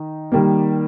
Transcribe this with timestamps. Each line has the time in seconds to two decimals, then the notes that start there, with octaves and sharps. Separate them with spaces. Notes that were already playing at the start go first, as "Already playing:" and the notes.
Already playing: D#3 D#4
0.32 D#3 G3 A#3